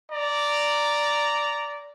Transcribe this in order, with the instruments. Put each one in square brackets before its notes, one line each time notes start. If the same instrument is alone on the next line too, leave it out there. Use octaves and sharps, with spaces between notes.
[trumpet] D5 [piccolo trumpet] A#5